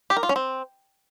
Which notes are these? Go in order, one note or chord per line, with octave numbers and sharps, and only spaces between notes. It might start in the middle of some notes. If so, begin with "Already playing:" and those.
G4
A#4
F4
C#4
C4